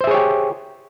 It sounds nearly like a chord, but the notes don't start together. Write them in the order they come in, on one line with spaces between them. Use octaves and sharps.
C5 E5 G#4 C#5 G4